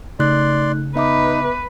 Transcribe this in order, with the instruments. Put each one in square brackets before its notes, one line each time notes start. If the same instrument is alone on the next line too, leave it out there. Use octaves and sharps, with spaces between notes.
[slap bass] C#3 [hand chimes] A3 D#4 F#6 [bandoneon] D5 C6
[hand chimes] B3 E5 D6 [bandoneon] D#4 [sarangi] B4